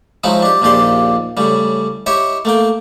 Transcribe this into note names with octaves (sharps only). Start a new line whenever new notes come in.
F3 F#3 G#3 D#4 E4
D4 G4
A#1 D#2 A#2 G4 D5 C6
A2 C#3 G3
E4 G4 C#5 D#5 E5
A3 A#3 G5